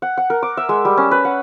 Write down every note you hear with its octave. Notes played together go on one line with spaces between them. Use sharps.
F#5
F#5
A#4
D6
E5
G#3
G3
C#4
B4
F#5